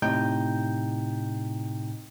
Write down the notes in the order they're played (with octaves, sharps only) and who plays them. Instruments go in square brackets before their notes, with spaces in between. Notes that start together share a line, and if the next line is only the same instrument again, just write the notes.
[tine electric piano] A2 C3 D#4 G5 G6